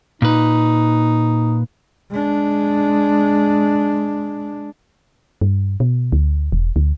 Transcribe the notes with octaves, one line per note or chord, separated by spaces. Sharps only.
A#2 D#4 B4
G#3 D4
G2
B2
D2
E1
D2